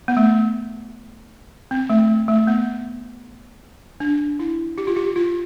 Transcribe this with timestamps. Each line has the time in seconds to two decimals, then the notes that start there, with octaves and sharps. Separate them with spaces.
0.08 B3
0.17 A3
1.71 C4
1.90 A3
2.28 A3
2.47 B3
4.00 D4
4.39 E4
4.78 G4
4.87 F4
4.96 G4
5.16 F4